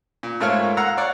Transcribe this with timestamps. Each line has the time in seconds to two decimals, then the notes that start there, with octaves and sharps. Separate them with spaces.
0.23 A#2
0.40 G#2 A3 A#3 F4 C#5 F6
0.77 F5 F#5 A#5 E6
0.97 C#5 D5 F#5